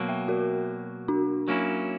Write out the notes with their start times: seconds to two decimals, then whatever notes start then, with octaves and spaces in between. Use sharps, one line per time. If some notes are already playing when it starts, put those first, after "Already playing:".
Already playing: B2 F#3 A#3
0.09 E5 G5
0.28 F#4 A#4
1.08 D4 F#4
1.48 F#3 A#3 C#4 E4